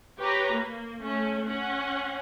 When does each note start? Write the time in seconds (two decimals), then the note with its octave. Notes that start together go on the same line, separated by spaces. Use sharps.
0.19 G4 B4 C#5 A#5
0.54 A#3
1.02 A3 C#4
1.47 C#4 F#5